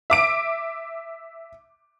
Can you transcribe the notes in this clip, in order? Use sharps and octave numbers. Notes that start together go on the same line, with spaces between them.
E5 D6 D7